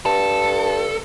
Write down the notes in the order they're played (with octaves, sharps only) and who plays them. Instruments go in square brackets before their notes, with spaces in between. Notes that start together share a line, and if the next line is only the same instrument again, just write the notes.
[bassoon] G2 [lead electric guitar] A4